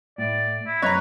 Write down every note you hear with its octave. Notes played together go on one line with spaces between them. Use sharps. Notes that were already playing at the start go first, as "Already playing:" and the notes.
A2 D5
E4
F#2 C4 B4 C#5 D#5 A#5